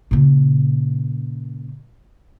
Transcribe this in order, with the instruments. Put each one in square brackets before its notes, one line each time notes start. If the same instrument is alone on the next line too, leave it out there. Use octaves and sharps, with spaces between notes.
[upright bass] A#2 C#3